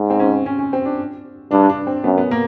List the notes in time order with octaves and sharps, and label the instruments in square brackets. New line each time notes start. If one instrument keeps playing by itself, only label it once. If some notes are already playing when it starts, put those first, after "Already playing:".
Already playing: [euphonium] G#2
[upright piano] C4
C#4
C#4
C#4
C4
D4
[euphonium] G2 [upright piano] D4
[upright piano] D4
C4
[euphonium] F#2 [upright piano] B3
[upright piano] B3
A#3